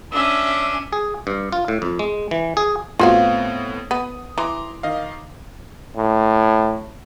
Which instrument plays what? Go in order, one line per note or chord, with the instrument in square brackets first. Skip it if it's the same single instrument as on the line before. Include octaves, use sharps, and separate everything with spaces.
[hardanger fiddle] C#4 D4 [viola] E5
[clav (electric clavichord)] G#4
G2
F4
A2
F2
G#3
E3
G#4
[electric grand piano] A2 B3 C4 [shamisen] F4 F#4 F5
[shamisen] B3 [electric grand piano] D#6
[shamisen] E3 [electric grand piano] A#5 C6 D6
[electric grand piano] D#3 D#5 F5
[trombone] A2